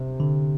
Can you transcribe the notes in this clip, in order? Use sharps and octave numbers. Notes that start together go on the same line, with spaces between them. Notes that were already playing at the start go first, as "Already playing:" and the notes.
Already playing: C3
D3